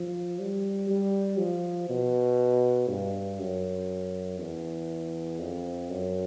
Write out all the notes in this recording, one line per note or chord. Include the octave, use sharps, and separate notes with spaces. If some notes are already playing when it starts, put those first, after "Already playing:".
Already playing: F3
G3
G3
F3
B2
G2
F#2
E2
F2
F#2